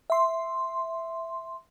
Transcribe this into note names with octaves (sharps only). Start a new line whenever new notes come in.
E5 C6